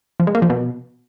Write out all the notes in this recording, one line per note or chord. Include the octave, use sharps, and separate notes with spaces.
F3
G#3
A#3
F3
B2